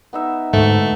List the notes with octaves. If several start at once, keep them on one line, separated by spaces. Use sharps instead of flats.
B3 D#4 E5
D2 G#2 G#3 A3